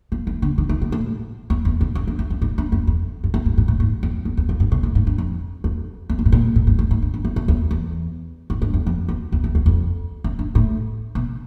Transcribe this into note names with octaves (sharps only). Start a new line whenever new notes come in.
F3
E3
D3
D#3
D#3
A#2
A2
F2
E2
F2
F#2
G2
F#2
F#2
G#2
G2
F#2
F2
F#2
F2
G2
G#2
A2
G#2
F2
F#2
E2
F2
G2
B2
A2
G#2
G2
F2
F2
F2
G#2
A2
A#2
A2
G2
A2
G#2
G2
G2
F#2
F#2
E2
E2
G#2
G2
F#2
F2
E2
E2
F2
E2
F2
F#2
G2
A2
B2